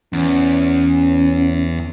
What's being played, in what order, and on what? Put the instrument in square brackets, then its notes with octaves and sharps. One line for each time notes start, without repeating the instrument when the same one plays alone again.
[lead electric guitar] E2 [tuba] C#4